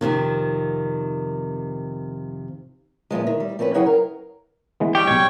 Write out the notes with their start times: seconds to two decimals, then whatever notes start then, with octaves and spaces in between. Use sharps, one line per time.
0.01 F2 A2 C3 D#3
3.11 E2 A#2 F3 G#3
3.27 D#3
3.40 G3
3.59 F3 C4 C#4 A#4 B4
3.74 C#3 F#3 E4 G#4 F#5 G5
3.86 A#4
4.80 E3 G#3 B3
4.95 G3 G4 G5 C#6
5.07 B1 G#3 C#5